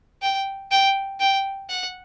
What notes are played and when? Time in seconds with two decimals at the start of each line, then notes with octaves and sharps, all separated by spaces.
0.22 G5
0.71 G5
1.20 G5
1.70 F#5